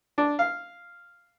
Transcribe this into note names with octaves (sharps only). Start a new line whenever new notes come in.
D4
F5